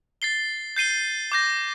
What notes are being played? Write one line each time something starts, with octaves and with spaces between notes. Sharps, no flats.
A6 C7 G7
G6 C7 D#7 G7
D6 G6 A#6